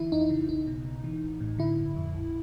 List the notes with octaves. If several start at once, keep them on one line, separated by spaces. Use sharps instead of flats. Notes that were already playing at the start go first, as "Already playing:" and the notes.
Already playing: D3 E3 E4
F2 D#4
E4
C#3
B1 D#4
B2
B2
E3
A1
A2
D3 E4
G1
F2
A#1